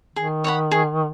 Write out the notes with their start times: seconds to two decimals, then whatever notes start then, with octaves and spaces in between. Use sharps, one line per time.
0.16 D#3 G#4
0.44 C#5 F#5 B5
0.71 G#4